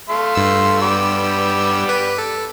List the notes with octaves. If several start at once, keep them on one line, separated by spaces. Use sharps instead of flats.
A3 F5 C6
G2 E6
G3 B3 D6
B4
A4